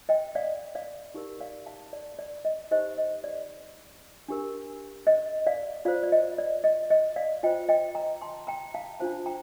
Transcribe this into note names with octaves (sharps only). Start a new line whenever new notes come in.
D#5 G5
D5 F5
D5 F5
D#4 G4 A#4
D5 F5
F5 A5
D5
D5
D#5
D#4 G4 C5 D#5
D#5
D5
D4 G4 A#4
D#5
D5 F5
F4 C5 D5 F5
D5
D#5
D5
D#5
D#5
D5 F5
F4 C5 D#5 G5
D#5 G5
G5 A#5
A5 C6
G5 A#5
F5 A5
D4 F4 C5 F5 A5
G5 A#5